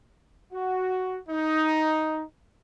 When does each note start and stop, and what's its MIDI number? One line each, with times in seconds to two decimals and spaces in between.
0.53 1.17 66
1.29 2.21 63